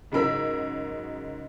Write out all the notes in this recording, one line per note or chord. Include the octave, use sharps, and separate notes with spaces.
G#2 C#3 F#3 A#4 E6 B6